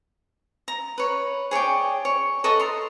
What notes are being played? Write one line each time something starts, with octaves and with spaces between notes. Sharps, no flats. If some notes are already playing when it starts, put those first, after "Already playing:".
A#5
B4 C#5
G#4 C#5 D5 G5
C#5
A4 B4 D#5 C#6
A#5 C6